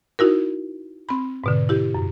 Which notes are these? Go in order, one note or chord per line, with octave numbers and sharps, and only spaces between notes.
D#4 E4 F#4 A#4
C4 B5
G#2 B2 D3
E4 G4
F#2